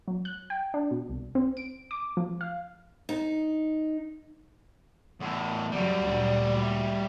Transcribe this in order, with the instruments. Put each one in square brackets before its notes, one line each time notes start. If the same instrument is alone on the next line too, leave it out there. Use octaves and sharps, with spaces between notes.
[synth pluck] F#3
F#6
G5
D4
B2
C2
C4
D7
D6
F3
F5
[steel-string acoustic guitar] D#4
[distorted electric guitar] E2 A2
[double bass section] F#2 C#3 F#3 [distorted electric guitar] G3 F#4 [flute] D5
[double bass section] D2 A#2
[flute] E5